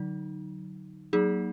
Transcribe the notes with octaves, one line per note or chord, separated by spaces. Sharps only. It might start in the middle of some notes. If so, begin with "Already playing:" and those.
Already playing: D3 F#3 D#4
F#3 A#3 D#4 G#4